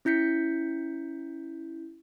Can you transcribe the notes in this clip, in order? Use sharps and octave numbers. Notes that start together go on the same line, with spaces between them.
C#4 E4 G6 B6 C#7